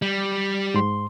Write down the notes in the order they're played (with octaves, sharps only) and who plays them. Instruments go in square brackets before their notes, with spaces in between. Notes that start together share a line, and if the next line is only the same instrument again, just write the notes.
[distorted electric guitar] G3
[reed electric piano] G#2 C6